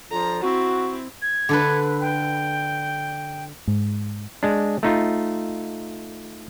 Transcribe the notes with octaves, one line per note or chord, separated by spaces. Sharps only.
D3 F3 F4 A#5
C4 E4 F#4
G#6
D3 A4 B4
G5
G#2
G#3 D4
A3 D#4 F4